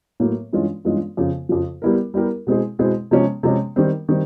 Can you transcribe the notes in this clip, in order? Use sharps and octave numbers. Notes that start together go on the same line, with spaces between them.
A2 F#3 A#3
G2 E3 G#3 C#4 F4
G2 E3 G#3 C#4 F4
F2 C#3 F3
F2 C#3 F3
G3 B3 E4 G4 A#4
G3 B3 E4 G4 A#4
B2 G#3 C4 E4 G#4
B2 G#3 C4 E4 G#4
C3 F3 G#3 C#4
C3 F3 G#3 C#4
D#3 G3 C4
D#3 G3 C4